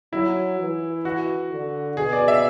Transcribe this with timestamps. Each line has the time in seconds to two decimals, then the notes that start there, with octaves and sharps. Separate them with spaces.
0.13 F#3 E4
0.59 E3
1.05 F#4
1.50 D3
1.97 B2 G#4
2.13 D5
2.28 E5